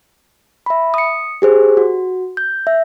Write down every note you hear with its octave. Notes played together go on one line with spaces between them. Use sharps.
E5 B5
D#6 C#7
G4 G#4 C5
F#4
G6
E5